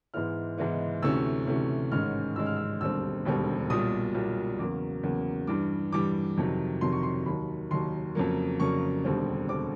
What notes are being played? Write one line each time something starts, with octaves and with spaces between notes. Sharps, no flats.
G#2 E3 G#3 B3 E4 F6
G#2 E3 G#3 B3 E4
D2 C3 E3 A3 C#4 E6
D2 C3 E3 A3 C#4
A1 G#2 D#3 G#3 C#4 F6
A1 G#2 D#3 G#3 C#4 E6
F6
E6
E1 D#2 D3 G3 C4 E6
E1 D#2 D3 G3 C4
B1 A#2 G3 D#6
B1 A#2 G3
E2 C#3 F#3 A#3 D6
E2 C#3 F#3 A#3
G2 E3 G3 D6
G2 E3 G3 D6
F2 C3 D#3 F#3
F2 C3 D#3 F#3 C6
C#6
C6
D#2 D#3 F#3 B5
D#2 D#3 F#3 C6
F2 C#3 F#3 A#3
F2 C#3 F#3 A#3 C#6
E1 D#2 D3 G3 C4
D3 G3 C4 D6